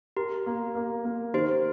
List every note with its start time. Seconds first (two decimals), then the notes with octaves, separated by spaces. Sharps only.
0.16 G4 A#4
0.46 A#3
0.75 A#3
1.05 A#3
1.34 D#3 G4 C5